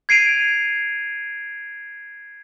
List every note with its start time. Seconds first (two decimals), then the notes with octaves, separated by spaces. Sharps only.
0.09 G#6 C7 D7 D#7 F7